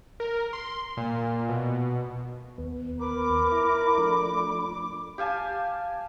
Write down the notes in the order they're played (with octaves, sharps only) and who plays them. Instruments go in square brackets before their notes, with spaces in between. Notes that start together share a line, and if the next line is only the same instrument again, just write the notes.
[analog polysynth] A#4
C6
A#2
B2
[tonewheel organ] D#2 B3
[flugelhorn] A#4 [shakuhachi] B5 [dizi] D6
[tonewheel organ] E4 A#5
F3 A3 D4
[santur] G4 F5 G#5 A5